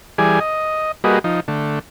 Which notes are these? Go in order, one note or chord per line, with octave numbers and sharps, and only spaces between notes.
E3 G3 G#4 D5 G#5
D#5
G3 A#3 F#4 G#4 B4 D#5
F3 D#4
D3 A3